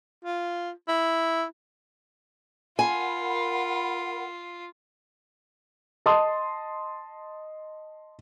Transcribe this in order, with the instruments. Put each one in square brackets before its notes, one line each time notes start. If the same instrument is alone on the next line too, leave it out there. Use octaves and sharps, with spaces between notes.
[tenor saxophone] F4
E4
[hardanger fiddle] F4 [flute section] A#4 F#5 B5 [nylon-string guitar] G#5
[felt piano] D#5 A5 C6 D#6